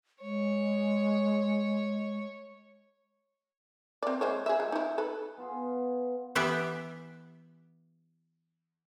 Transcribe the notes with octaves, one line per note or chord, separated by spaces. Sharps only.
G#3 C#5
C4 D5
G#3 C5 C#5
G#4 E5
F3 G#3
D#4 E4
A4 B4
B3 F4 G#4
E3 B3 G4 E5